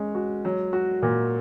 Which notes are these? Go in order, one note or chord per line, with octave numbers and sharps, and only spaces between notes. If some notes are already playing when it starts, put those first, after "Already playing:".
Already playing: G#3 C#4
F#4
F#3
F#4
A#2